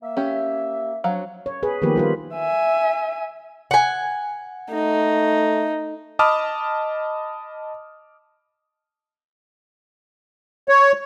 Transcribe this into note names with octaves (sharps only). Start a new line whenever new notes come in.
A#3 E5
C#4 G4
F#3 C4 D4 C#5 F5
C#5
G#4 B4
D#3 F3 A#3 B3 G4 B4
G3 F4 B4
E5 G#5
F#5 G#5
A3 D#4
D#5 A5 B5 D6 D#6 F6
C#5